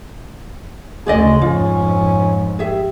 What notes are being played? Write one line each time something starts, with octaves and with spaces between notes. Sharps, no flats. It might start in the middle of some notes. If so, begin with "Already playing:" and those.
D2 C#3 G#3 G#4 D5 D#5
F2 G#2 C#4 F4
G4 G#4 E5